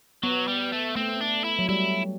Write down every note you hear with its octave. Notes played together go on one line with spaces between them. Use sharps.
F#3 B3
G3
A3
A3 C4
D4
E4
F#3
G3 E4